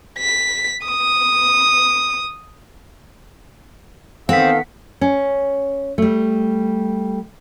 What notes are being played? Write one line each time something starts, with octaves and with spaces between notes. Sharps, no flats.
B6
D#6
D#3 B3 C4 A4 F5 F#5 B6
C#4
G3 A3